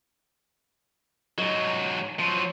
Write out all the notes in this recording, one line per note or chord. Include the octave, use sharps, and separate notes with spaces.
G#2 F#3 D#5
F3 F#3